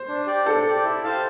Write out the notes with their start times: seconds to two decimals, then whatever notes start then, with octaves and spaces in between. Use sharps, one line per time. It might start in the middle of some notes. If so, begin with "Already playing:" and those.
Already playing: C5
0.08 D4
0.26 G4 D5
0.46 D4 A4
0.65 G4 D5
0.84 E4
1.04 G4 C5 F5 A5